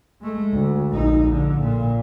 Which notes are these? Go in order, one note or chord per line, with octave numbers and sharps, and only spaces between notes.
G#3 A3
D2
A#1 D#4
D3
A#2